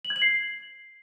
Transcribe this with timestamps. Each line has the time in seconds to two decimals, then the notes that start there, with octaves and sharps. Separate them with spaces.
0.05 F#7
0.10 G#6
0.16 F#7
0.22 C7